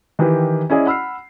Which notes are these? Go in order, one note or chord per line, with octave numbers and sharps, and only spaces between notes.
D#3 E3 E4 G4 B4
C#4 E4 G#4 D5 D#5
F#5 B5 E6 F6 C7